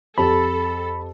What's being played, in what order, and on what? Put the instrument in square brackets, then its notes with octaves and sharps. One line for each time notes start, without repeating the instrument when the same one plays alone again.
[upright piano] F2 G4 A5 [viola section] A4 [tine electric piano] B5